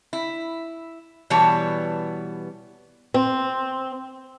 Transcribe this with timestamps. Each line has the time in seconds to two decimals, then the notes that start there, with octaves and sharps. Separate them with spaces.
0.13 E4
1.30 B2 E3 G3 B3 C#5 A5
3.14 C4